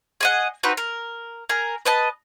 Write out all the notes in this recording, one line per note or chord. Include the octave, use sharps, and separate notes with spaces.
G#4 D#5 F#5
C4 D#4 F#4 B4
A#4
G#4 A#4
B4 D#5 A5